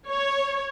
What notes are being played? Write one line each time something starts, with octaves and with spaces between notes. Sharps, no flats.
C#5